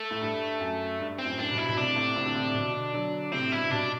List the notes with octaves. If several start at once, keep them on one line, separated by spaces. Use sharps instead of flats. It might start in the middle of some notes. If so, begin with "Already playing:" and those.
Already playing: A3
A2
G2
F#2
G2
C4
F#2 A2
D4
G2 B2
E4
B2
A2 C3 D4
A2 C3
A2 C3
D3
A2 C3
B2 D3
D3 F#3
A2 C3 C4
G2 B2 E4
C3
G2 B2 D4